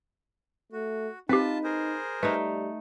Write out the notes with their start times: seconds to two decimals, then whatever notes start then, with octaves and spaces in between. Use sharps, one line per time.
0.72 A3 F#4
1.29 C4 D#4 F4 G4 B4 A5
1.64 G#4 A#4 C5
2.23 G3 A3 D#4 B4